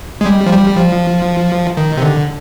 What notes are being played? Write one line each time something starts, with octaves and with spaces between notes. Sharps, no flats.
G#3
G3
F3
G3
F3
D#3
C3
D3